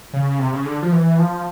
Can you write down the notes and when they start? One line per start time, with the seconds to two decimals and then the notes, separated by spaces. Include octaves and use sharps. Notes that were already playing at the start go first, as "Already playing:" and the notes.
0.13 C#3
0.39 C3
0.53 C#3
0.65 D3
0.82 F3
0.92 E3
1.19 F3